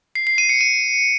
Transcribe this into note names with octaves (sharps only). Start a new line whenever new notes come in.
C7
C7
D#7
C#7
D#7